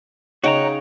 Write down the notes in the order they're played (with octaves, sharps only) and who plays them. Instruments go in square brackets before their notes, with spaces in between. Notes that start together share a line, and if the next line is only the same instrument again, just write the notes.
[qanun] C#3 D#4 [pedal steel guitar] F#4 G5 A#5 [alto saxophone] C#5